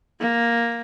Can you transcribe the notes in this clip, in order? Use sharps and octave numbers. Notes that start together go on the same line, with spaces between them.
A#3